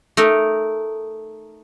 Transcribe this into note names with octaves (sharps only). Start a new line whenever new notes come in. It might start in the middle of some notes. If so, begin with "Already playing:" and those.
A3 D#4 A#4